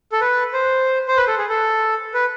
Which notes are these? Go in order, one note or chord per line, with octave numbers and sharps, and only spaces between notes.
A4
B4
C5
C5
B4
A4
G#4
A4
B4